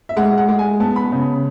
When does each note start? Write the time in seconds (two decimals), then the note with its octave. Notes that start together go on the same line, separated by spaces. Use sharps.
0.09 E5
0.17 G#3 F#5
0.38 F#5
0.49 G#3
0.59 G#5
0.80 B3 A5
0.96 B5
1.12 C#3